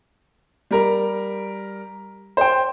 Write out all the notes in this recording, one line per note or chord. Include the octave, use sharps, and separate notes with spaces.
G3 A#4 A#5
C5 G5